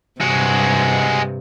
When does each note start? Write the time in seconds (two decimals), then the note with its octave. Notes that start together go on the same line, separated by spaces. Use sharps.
0.21 G2 C3 G#3 F#4